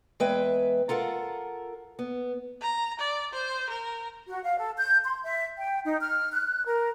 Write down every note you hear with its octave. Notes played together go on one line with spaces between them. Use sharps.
E2 G#3 B4 E5 G5
F4 A4 A#4 F#5
B3
A#5
D5
C5
A#4
F#4
F5
A4
G6
C6
E5
G5
D#4
F6
F#6
A#4